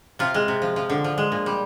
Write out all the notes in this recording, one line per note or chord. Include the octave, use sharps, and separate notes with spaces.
C3 F4
G#3
C3
F3
F3
D3
F3
G#3
A#2
G3